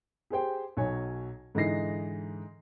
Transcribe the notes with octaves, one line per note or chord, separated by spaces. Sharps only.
G4 G#4 C5 G5
B1 F#3 C#5 G#5
G#2 D3 E3 D#4 A#6 C7